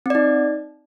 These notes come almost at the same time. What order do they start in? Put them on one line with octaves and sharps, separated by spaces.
C4 D5 D#4